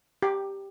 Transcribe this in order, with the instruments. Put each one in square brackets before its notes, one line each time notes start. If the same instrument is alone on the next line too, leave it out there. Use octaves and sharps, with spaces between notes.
[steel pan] G4